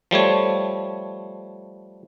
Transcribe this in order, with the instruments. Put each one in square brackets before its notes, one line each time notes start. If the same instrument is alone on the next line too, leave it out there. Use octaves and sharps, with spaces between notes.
[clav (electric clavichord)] F3 G3 A3 C#5